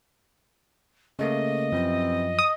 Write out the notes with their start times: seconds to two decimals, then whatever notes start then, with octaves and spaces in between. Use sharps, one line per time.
1.19 C#3 A3 A#3 D#5
1.72 F#2 C3 E3 F3 C4
2.39 D#6